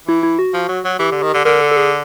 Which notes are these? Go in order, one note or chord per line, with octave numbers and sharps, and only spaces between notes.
E3 E4
E4
F#4
F3
F#3
F#3
E3 G4
D3
D#3
D3
D3 A#4
A4
A4
G#4